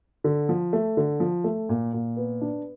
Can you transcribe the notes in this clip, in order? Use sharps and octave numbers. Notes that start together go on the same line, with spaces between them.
D3
F3
A3
D3
F3
A3
A#2
A#2
B3
D4